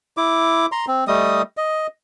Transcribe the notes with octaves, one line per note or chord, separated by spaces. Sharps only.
E4 D6
A#5 C6
C4
G3 A3 D#5 D#6
D#5